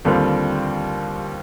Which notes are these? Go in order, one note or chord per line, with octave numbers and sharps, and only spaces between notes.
D#2 D3 G3 C4 F4